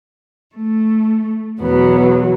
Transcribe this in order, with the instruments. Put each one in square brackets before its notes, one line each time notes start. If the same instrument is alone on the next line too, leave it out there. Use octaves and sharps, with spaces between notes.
[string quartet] A3
E2 B2 F#3 B3